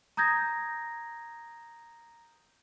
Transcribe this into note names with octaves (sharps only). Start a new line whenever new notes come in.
A#5 D#6 G6 G#6 A#6